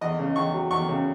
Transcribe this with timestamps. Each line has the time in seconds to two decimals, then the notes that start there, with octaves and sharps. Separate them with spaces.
0.01 E2 D#5
0.19 C#3
0.36 E2 C#6
0.54 F#3
0.71 E2 C#6
0.89 C#3